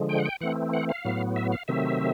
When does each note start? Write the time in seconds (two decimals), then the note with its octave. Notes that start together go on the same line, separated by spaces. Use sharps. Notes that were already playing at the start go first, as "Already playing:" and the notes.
Already playing: D3 F3 G#3
0.09 G5
0.19 F#5
0.25 G5
0.41 E3 A3 C4 F#5
0.74 F#5
0.89 F5
1.05 A2 F#3 B3
1.36 E5
1.52 F5
1.68 C3 D#3 F#3 A3 C4 E5